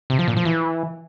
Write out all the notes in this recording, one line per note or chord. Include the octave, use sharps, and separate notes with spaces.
C3
F3
A#2
F3
E3